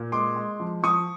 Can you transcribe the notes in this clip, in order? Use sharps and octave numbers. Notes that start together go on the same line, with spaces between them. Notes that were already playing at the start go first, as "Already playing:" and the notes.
Already playing: A#2
G#3 C6 D6
G#3
F3
F3 C#6 D#6